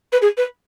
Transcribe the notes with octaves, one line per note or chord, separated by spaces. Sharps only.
B4
G#4
B4